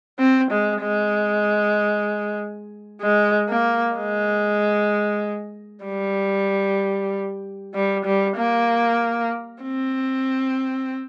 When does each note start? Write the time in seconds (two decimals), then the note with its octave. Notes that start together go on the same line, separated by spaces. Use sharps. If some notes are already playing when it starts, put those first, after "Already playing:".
0.19 C4
0.51 G#3
0.82 G#3
3.01 G#3
3.49 A#3
3.96 G#3
5.85 G3
7.75 G3
8.05 G3
8.37 A#3
9.63 C4